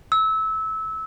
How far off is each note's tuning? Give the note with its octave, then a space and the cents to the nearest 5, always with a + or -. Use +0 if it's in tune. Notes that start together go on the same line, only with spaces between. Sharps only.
E6 -20